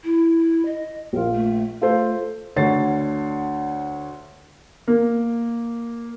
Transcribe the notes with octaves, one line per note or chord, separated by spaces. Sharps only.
E4
D#5
A#1 F4 A#4
A3
A3 F4 A4 C5
D2 D3 C#5 A6 C7
A#3